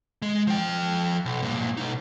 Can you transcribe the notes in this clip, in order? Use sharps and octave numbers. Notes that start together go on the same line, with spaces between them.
G#3
F3 G5
B1
G2 A#2
B2 D#4